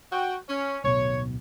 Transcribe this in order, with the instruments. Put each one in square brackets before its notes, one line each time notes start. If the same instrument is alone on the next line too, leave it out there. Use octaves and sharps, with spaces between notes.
[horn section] F#4 G5
C#4
[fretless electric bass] D1 B1 B2 [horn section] C#5